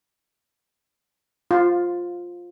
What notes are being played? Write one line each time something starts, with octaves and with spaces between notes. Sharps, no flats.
F4